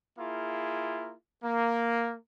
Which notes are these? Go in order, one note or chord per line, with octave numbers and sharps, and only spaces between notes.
A#3 E4 F4 G#4
A#3